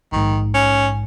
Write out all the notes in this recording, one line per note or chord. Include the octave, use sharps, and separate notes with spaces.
A#1 G#2 D#3
C#4